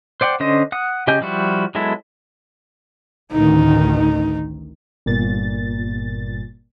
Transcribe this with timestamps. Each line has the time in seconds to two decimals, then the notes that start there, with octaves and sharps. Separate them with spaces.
0.21 C5 D5 F#5 G5
0.40 D3 C#4 C5 D#5
0.72 F#5 D#6
1.07 C#3 G4 D#5 G#5 G6
1.21 F3 G3 E4 F#4
1.75 F#3 G#3 B3 E4 A4
3.32 A1 D2 D#3 D#4
5.06 G1 A#2 A6